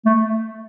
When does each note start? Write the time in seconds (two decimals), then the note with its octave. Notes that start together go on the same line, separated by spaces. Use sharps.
0.06 A3